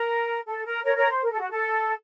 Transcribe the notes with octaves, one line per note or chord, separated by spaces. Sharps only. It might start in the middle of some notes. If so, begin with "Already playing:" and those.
Already playing: A#4
A4
A#4
A#4 C#5
A#4 C#5
C5
A#4
A4
F#4
A4